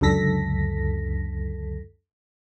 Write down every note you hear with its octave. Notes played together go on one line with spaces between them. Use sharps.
C#2 F#2 D3 A4 A#6 B6